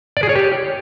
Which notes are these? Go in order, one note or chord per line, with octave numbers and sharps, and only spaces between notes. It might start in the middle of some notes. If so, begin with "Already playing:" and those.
D5
G#4
C#5
G4